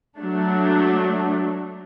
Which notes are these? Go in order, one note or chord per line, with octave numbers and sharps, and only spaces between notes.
F#3 A3 D4